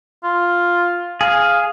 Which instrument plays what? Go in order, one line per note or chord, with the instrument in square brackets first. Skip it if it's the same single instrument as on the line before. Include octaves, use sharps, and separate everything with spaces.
[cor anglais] F4
[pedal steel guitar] G#4 [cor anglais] F5